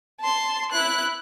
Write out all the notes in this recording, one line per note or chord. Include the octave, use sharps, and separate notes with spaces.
A5 C6
E4 F#6